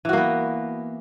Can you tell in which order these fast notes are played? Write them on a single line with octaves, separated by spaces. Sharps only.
E3 F#4 A#3 B3